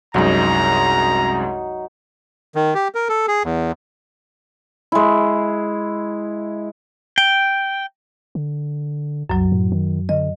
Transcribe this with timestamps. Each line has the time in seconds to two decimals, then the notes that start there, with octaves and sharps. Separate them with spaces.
0.14 C2 F#2 F#3 G#3 D#4 A#5
2.55 D#3
2.75 G4
2.95 A#4
3.09 A4
3.28 G#4
3.44 E2
4.92 G#3 E4
7.18 G5
8.35 D3
9.30 C2 F#2 F#3
9.52 A2
9.72 D#3
10.09 D3 D#5